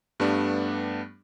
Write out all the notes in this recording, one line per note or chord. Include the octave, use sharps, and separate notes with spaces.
G2 G3 A3 B3 D4